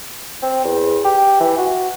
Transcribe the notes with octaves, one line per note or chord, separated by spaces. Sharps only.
C4
E2
G4
E3
F#4